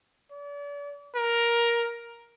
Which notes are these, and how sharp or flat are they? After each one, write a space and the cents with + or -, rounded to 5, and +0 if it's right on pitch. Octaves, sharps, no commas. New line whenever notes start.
D5 -40
A#4 +10